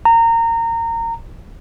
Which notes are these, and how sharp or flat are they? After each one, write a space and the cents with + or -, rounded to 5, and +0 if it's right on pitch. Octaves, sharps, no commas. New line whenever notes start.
A#5 -25